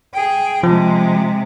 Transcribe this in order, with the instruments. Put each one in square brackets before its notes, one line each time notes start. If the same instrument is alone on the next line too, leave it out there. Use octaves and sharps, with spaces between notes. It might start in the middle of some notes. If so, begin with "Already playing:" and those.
[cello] G#4 G5
[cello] C3 G#3 [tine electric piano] F3